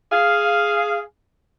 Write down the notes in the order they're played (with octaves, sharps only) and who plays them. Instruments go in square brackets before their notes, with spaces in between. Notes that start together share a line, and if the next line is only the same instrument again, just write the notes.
[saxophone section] G#4 F5